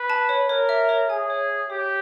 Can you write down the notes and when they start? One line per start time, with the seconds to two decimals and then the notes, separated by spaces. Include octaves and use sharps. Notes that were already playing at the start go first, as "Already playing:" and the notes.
Already playing: B4
0.10 A5
0.29 C#5
0.49 A#4 C#5
0.69 E5
0.89 C#5
1.09 G#4 G#5
1.30 C#5
1.50 C#5
1.70 G4 C#5